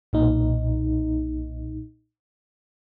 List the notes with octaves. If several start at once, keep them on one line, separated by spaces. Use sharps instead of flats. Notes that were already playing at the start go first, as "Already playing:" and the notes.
B1 A#2 D#4